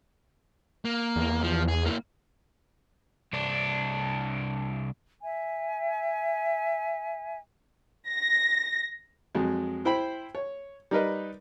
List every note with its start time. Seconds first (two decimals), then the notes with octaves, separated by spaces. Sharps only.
0.85 A#3
1.16 E2
1.43 F3
1.68 G#4
1.86 A#3 E4
3.33 C2 D4
5.23 E5 G#5
8.08 A#6
9.35 F2 F#3 G#3
9.85 E4 C5 G5 B5
10.35 C#5
10.91 G3 D#4 A#4 B4 D#5